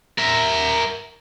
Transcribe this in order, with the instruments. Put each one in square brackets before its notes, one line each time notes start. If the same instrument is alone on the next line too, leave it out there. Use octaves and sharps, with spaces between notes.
[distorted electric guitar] A#4 E5